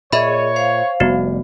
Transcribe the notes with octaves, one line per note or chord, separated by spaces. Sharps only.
A#2 G#4 C#5 D#5 E5 B5
C5 F5
F1 G3 B3 F#4